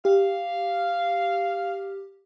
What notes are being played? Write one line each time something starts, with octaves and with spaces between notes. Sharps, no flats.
G4 F5